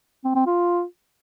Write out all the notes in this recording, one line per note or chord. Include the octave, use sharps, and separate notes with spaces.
C4
C4
F4